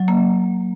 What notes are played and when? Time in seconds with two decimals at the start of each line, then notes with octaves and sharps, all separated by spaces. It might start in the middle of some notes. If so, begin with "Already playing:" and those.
Already playing: F#3
0.08 A#3